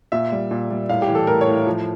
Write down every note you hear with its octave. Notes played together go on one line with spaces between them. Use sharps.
A#2 E5
G3
A#2
G3
A2 F5
G4
E3
A4
A2 A#4
C#5
A2
F3